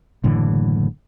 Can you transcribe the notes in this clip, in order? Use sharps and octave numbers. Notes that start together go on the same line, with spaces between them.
F#1 A2 D3 E3